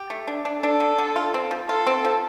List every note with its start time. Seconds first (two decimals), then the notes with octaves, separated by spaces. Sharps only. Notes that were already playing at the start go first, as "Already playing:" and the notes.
Already playing: G4
0.10 A3
0.27 D4
0.45 D4
0.62 D4 A4
0.80 D3
0.98 D3
1.16 F4
1.34 C4
1.51 F3
1.69 F4 A4
1.87 C4
2.05 F3